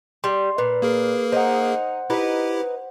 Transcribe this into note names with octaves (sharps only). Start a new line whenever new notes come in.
G3 C6
A#2 B4
A#3 G#4 A#4
D#4 C5 F#5
D#4 E4 G4 B4